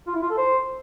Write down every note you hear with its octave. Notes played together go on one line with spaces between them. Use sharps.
F4
E4
F4
A4
C5